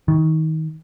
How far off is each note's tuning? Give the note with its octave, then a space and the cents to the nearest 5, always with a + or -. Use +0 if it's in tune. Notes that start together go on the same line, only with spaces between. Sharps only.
D#3 +25